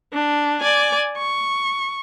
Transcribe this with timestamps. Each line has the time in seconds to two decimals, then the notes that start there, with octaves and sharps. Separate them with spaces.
0.13 D4
0.61 D5 G#5
1.18 C#6